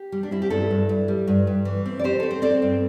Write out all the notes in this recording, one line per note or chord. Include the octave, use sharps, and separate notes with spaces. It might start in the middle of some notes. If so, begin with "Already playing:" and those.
Already playing: G4
G3
D4
C4 E4
G4
G2 E4 A4
G2
G2
G3
G2
G2
E3
C4
D5
C4 G4 C5
C4 A4
C5
C4 A4 D5
G2